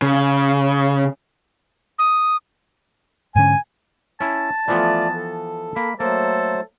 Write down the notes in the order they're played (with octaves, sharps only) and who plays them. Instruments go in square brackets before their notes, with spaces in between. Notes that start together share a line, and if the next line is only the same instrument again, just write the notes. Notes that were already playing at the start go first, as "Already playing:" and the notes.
[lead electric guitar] C#3
[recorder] D#6
[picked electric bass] G#2 D3 C#4 [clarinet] G#5
[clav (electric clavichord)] C#4 E4 [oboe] A5
[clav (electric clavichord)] E3 F3 B3 [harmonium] A3 F4 D5
[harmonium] A4
[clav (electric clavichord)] A#3 [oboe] B5
[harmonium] F#3 A3 C5 [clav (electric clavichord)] A#3 [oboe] A4